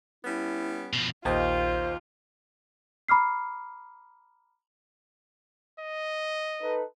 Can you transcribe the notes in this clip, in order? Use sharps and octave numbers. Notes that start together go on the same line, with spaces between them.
G3 B3 C#4 E4
B2 F3
A#1 D#2 F4 C5 D#5
A#5 B5 D6 F6 C7
D#5
D#4 A4 B4